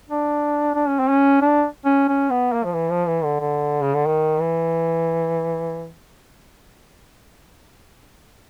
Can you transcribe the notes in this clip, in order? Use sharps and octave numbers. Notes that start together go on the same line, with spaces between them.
D4
D4
C#4
C4
C#4
D4
C#4
C#4
B3
A#3
F3
E3
F3
E3
D3
D3
C#3
D3
D#3
E3